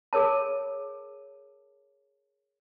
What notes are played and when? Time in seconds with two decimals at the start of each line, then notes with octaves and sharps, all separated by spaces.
0.13 G#4 A#4 C#5 A5